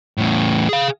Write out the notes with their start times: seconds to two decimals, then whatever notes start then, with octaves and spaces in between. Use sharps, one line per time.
0.18 E2 A2
0.69 G#4 F5